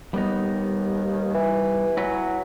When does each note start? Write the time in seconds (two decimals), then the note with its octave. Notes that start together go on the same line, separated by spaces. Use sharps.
0.14 D#2 G3 B3 D#4
1.34 E3
1.97 F#3 E4 F#4 B4